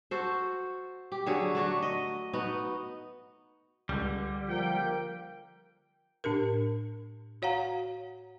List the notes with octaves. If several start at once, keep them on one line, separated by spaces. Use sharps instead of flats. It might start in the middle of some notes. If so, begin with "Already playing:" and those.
F#4 A4 C5
G4
D3 F#3 G#4 C#5
A3 D4 F#4
D#5
B3 D#4 F#4
C#2 D3 G3
F3 A#3 G5
A2 D4 G4 A#4
F#4 C#5 F5 F#5 A#5